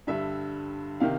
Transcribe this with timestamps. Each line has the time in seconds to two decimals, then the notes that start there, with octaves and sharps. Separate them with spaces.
0.07 G2 D3 G3 E5
1.00 C3 D#3 F5